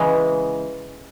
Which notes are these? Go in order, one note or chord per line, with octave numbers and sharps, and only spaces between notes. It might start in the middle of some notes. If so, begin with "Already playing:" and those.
Already playing: C#3 E3 G#3